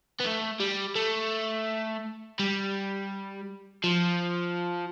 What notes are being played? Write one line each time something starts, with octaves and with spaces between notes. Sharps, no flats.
B3
A3
G3
A3
G3
F3